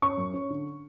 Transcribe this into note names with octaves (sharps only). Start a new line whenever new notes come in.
C#4 C#6
F#2
C#4
D3